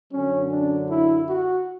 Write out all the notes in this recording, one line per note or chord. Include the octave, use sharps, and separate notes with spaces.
F#2 D3 F#3 C#4
D4
E4
F#4